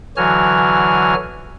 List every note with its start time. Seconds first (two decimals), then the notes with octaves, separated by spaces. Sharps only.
0.17 D3 E3 F#3 F#4 G#5 F6